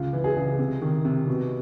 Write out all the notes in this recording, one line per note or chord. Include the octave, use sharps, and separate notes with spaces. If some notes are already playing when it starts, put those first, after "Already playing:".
Already playing: C#2 F4
E3
G#4
C#2
C3
D#3
C3
B2